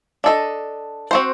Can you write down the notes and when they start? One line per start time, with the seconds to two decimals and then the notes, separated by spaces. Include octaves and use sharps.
0.24 D4 A4 D#5
1.11 C4 F#4 C5